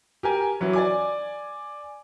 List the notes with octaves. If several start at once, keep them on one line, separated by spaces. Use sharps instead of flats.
G4 A#4 G#5
E3 F#3 C#4
D5 G#5 D6